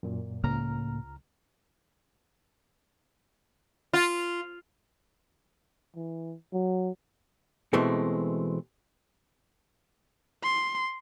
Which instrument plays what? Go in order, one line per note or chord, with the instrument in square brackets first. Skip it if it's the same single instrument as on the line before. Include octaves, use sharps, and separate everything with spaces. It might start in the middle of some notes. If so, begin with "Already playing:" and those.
[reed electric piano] F#2 A#2
[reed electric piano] C#2 A#5 F6 [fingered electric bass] A2 C#3 A#3
[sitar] F4
[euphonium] E3
F#3
[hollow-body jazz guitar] B2 E3 G#3 A3 C4
[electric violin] C6